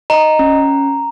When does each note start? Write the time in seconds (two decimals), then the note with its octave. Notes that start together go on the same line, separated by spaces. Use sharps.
0.10 D#5 A#5
0.39 C#4